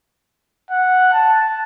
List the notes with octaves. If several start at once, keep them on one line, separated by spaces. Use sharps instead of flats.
F#5
A5